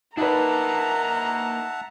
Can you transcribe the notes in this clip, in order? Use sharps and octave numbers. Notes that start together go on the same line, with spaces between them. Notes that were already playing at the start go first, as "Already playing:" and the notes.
A#3 D4 D#4 B4 E5 F#5 A5 A#5